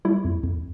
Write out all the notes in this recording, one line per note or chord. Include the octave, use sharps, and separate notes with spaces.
G3 E4
F2
F2